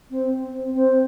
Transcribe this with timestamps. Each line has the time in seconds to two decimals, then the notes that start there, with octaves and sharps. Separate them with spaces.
0.11 C4
0.51 C4
0.74 C4